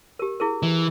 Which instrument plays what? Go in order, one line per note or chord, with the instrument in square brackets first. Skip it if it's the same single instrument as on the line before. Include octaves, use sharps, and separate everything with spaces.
[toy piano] G4 A#4
E4 G#4 A#4
[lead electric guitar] E3